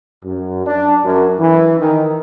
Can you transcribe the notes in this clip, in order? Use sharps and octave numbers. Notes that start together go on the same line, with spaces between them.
F#2
D4
F#2
E3
D#3